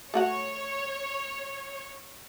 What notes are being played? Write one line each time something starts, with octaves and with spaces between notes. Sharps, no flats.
A3 F#4 C#5 F#5